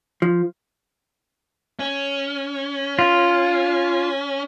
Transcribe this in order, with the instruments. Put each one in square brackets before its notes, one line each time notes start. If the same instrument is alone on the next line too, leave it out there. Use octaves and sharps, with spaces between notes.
[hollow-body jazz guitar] F3
[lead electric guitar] C#4
[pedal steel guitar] F4